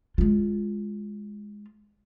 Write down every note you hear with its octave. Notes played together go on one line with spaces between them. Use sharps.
G#3 F4